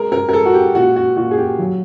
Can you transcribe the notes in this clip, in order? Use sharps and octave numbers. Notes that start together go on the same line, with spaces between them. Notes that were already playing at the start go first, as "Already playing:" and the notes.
Already playing: G#3 A#4
A#4
A#4
G#3 A4
F#4
G4
A#2 F#4
F#4
A#2 F#4
G#4
G4
F#3